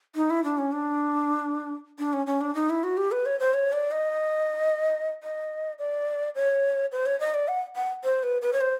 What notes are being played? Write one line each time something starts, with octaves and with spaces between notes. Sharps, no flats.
D#4
E4
D4
C#4
D4
D4
C#4
C#4
D4
D#4
E4
F#4
G4
B4
C#5
C5
C#5
D5
D#5
D#5
D5
C#5
C5
C#5
D#5
D5
F#5
F#5
C5
B4
B4
C#5
C5